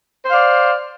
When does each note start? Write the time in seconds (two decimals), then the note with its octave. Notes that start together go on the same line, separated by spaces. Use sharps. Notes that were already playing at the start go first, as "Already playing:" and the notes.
0.25 C5
0.29 F5
0.33 D5